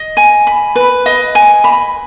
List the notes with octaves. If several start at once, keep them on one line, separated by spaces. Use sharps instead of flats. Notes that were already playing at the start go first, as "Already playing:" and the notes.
Already playing: D#5
G#5
B5
B4
D#5
G#5
B5